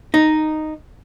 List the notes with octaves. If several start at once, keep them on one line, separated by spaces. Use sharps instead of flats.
D#4